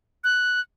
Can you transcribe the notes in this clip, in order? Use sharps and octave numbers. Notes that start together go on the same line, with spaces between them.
F#6